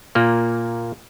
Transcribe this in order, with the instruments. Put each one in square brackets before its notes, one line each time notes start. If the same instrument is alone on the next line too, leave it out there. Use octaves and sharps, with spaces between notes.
[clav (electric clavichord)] A#2 A#3